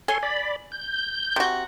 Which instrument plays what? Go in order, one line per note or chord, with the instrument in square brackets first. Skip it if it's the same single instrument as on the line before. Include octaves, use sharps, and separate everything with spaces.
[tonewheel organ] A4 C#5 C6 [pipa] G#5
[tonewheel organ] D5 B5
G6
[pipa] C3 F#4